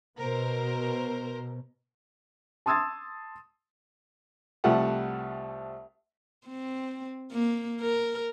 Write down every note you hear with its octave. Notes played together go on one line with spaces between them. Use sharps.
B2 A#4 C5
A5 C6 D#6 E6 G#6 A6
C2 F3 G3 A3 F#5
C4
A#3
A#4